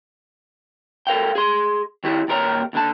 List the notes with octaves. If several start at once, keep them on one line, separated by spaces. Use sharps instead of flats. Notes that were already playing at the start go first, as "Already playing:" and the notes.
A4 A#4 F5 G5
G#4 C6
D#3 E4 G4
D#2 A#2 G4 A#4 C#5 A#5
D#2 D3 A5